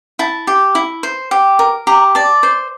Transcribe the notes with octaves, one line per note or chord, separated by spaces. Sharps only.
E4 A5
G4
E4
C5
G4
A#4
G4 A#5
D5 A5
C5